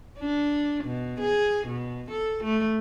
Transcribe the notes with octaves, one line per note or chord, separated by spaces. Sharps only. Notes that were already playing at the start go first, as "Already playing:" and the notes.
D4
B2
G#4
B2
A4
A3